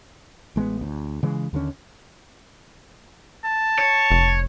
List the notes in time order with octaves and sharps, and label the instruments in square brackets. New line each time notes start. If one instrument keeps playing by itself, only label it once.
[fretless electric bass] A1 G#3 A3 B3
D2
C#3 E3 G#3
D#2 D3 D#3 C#4
[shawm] A5
[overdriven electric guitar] C#5
[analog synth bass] F1